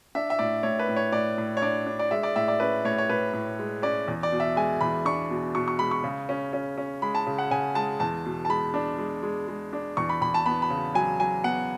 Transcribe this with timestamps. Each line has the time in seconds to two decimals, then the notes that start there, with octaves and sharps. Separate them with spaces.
0.15 D4 E5
0.30 E5
0.39 A2 D5
0.63 A2 C#5
0.79 B4
0.89 A2
0.96 C#5
1.12 A2 D5
1.38 A2
1.57 C#5
1.62 D4 D5
1.86 D4
1.99 D5
2.11 G#3 E5
2.23 D5
2.36 A2 E5
2.48 D5
2.60 C#4 B4
2.85 A2 C#5
2.98 C#5
3.09 A2 B4
3.33 A2
3.59 G#3
3.82 C#4 D5
4.08 E2
4.23 D5
4.32 B2
4.40 E5
4.56 G#3 G#5
4.81 E2 B5
5.05 D4 C#6
5.30 B2
5.55 B2 C#6
5.68 C#6
5.79 G#3 B5
5.91 C#6
6.04 C#3
6.29 C#4
6.53 C#4
6.78 C#4
7.02 G#3 B5
7.15 A5
7.27 C#3
7.38 F#5
7.51 C#3 G#5
7.75 G#3 A5
8.00 E2 A5
8.26 B2
8.45 A5
8.49 G#3 B5
8.74 D4
8.98 G#3
9.23 G#3
9.48 G#3
9.73 D4
9.97 E2 C#6
10.09 B5
10.21 E2 B5
10.34 A5
10.46 B3 B5
10.62 B5
10.70 C#3
10.95 F#3 G#5
11.20 F#3 G#5
11.44 B3 F#5